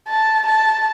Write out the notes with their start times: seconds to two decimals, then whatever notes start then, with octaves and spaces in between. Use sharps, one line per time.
0.08 A5
0.46 A5